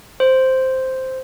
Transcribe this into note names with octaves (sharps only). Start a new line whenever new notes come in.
C5